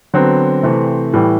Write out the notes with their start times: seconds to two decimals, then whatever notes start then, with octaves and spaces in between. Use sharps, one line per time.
0.14 D3 F#3 B3 C4
0.63 C3 E3 A3
1.13 A2 E3 G3